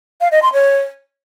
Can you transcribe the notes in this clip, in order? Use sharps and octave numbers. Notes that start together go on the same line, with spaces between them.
F5
D#5
C6
C#5